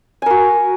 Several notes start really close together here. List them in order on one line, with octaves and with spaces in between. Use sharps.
G#5 A#4 F#4